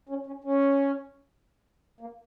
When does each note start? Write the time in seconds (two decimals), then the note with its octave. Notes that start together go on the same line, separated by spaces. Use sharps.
0.09 C#4
0.27 C#4
0.44 C#4
2.00 A#3